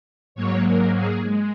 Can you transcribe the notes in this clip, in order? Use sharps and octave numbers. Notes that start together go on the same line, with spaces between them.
G#2 F#3 A#3 C#5
A#4
G#4
G#3